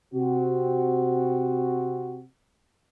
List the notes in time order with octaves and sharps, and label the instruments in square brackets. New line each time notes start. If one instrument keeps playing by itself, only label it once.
[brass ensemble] C3 C4 F#4